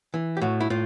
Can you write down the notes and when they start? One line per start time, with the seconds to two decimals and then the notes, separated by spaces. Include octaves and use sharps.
0.14 E3
0.37 G4
0.42 A2 F#4
0.61 E4
0.70 A2 F4